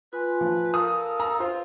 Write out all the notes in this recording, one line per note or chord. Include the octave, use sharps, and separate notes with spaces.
F4 B4 G#5 C6
F3
A4 A#4 F5 D#6
A#5 E6
F4 B4 C5 F5